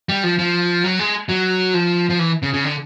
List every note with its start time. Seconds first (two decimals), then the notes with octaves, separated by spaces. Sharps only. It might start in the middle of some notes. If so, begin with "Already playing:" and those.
0.09 G3
0.23 F3
0.39 F3
0.84 F#3
0.99 G#3
1.29 F#3
1.74 F3
2.10 F3
2.19 E3
2.42 C#3
2.53 C#3
2.64 D3